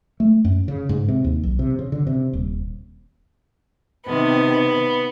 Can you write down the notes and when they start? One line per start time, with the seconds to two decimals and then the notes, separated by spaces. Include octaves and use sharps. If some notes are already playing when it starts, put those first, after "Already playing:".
0.20 A3
0.45 F#2
0.68 C#3
0.89 G#2
1.08 C3
1.24 D#2
1.43 B1
1.59 C3
1.79 C#3
1.92 D3
2.07 C3
2.33 D#1
4.06 C3 D#3 B3